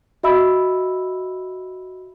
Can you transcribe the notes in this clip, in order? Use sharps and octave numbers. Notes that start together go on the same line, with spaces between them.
F#4 D#5 E5 B5 E6